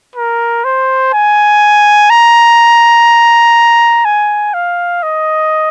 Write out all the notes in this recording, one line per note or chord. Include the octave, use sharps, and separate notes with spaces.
A#4
C5
G#5
A#5
G#5
F5
D#5